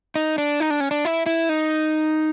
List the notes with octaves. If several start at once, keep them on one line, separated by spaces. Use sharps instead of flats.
D#4
D4
D#4
D4
C#4
D4
E4
E4
D#4